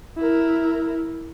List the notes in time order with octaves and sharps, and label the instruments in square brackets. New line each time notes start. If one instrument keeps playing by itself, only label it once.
[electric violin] E4 A#4